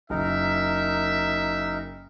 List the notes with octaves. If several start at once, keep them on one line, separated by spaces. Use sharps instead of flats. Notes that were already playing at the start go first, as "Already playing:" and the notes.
F#1 D#4 A#4 E5